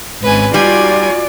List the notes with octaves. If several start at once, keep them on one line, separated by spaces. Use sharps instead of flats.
G#1 G#2 C#4 B4 G#5
G3 D#4 F4 F#4 D5 G#5